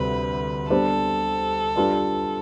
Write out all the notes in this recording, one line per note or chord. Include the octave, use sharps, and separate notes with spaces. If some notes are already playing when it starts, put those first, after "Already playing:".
Already playing: D2 C3 G3 C4 B4
G3 B3 D4 G4 A4 C5
G3 D4 F4 B4 D5